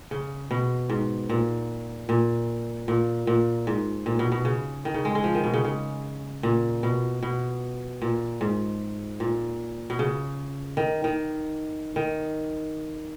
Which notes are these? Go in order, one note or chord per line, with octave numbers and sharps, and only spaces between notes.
C#3
B2
G#2
A#2
A#2
A#2
A#2
G#2
A#2
B2
B2
C#3
D#3
C#3
G#3
G#3
F3
D#3
B2
C#3
C#3
A#2
B2
B2
A#2
G#2
A#2
B2
C#3
D#3
D#3
D#3